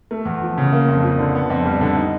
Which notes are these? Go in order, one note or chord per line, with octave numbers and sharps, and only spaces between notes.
A3
E2
F3
C#3
A#3
F2
F3
D3
B3
F2
G3
D3
D#4